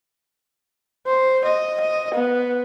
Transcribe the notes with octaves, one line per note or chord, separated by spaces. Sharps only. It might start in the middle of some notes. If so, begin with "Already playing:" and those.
C5
D#5
D#5
B3